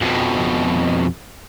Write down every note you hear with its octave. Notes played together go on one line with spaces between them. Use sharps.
F2 B2